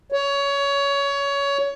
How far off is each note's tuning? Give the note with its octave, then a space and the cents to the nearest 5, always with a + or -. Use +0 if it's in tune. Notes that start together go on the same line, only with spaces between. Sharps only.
C#5 +20